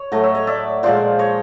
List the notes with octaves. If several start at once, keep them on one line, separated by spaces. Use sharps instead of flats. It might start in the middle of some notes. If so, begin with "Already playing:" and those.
Already playing: C#5
A2 F#3 A3 D#5
E5
C#5 D#5
D5 E5
A#2 F3 G#3 C5 D5
C#5 D#5